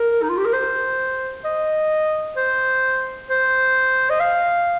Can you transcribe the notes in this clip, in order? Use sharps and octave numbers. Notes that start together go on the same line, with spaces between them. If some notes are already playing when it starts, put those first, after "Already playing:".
Already playing: A#4
D#4
F4
G4
A#4
C5
D#5
C5
C5
D#5
F5